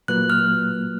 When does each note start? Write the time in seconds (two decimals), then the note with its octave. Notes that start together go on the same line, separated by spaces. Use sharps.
0.08 A#2 F#3 A#3 F4 B4 F#6
0.30 F6